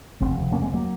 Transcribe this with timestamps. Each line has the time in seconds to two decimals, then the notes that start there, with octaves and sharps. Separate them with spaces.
0.21 F1 D#2 C#3 G#3 C4
0.52 A#3 C#4
0.62 G#3 C4
0.74 F#3 A#3